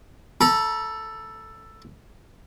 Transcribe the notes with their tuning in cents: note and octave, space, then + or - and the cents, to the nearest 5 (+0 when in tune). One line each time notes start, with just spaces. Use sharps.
A4 +5 A#5 +45